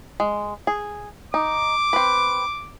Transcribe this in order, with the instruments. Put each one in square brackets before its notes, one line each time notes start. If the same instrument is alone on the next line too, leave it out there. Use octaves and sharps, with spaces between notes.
[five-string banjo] G#3
G#4
[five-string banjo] D#4 [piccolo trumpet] D6
[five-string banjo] C4 B4